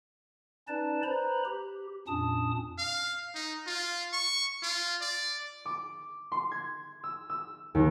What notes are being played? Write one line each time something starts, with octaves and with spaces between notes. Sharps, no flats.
C#4 D#4 B4 D5 A5
B4 C5 A#5 B5
G4
F2 A#2 C#4 D4 A5 D#6
F5
D#4
F4
C#6
F4
D5
D6
C6
G#6
E6
E6
D#2